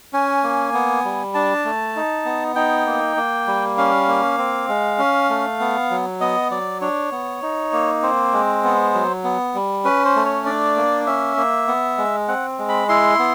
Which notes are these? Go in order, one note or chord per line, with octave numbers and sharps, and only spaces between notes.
C#4 G#5
A#3
B3
G3
D4 A5
A3
D#4
B3
D#4 G5
A#3
A#3
G3
C#4 F5
A#3
C4
G#3
C#4
A3
B3
F#3
B3 D#5
F#3 D5
D4 C#5
B3
D#4
A#3
C4 C5
G#3
B3
F#3
B3
G3
C#4 B4
C5
A3
C#5
D4 D5
A#3
C#4 E5
A#3
B3
G#3
C4 F#5
G#3
B5
E4 C6
B3